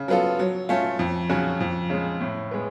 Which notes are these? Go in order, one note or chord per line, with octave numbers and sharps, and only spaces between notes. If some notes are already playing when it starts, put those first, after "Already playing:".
Already playing: C#3
F#3 B3 F4 A4
F#3
A3 C#4 F4
F2
C#3 F#3 C#4 F#4
F2
C#3 G#3
A2
G#3 B3